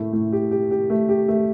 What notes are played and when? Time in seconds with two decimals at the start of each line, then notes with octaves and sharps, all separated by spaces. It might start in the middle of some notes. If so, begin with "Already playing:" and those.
Already playing: A2 A3
0.13 A2
0.33 G4
0.51 G4
0.71 G4
0.90 A3
1.09 G4
1.28 A3